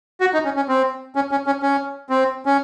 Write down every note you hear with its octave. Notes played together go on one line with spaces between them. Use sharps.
F#4
D#4
C#4
C#4
C4
C#4
C#4
C#4
C#4
C4
C#4